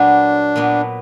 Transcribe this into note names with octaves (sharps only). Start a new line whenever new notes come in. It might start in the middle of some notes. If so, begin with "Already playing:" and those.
Already playing: A#2 F#3 B3 D4
A#2 F#3 B3